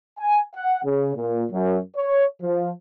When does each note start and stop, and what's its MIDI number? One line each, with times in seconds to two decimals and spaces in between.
0.18 0.41 80
0.54 0.79 78
0.84 1.12 49
1.15 1.43 46
1.50 1.77 42
1.94 2.24 73
2.41 2.69 53